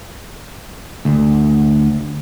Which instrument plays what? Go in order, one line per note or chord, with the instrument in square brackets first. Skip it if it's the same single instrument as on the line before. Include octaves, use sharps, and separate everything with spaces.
[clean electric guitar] D2